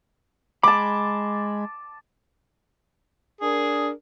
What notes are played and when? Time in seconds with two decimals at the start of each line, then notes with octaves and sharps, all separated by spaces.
0.63 G#3 A5 B5 D6
3.41 D4 G#4 A#4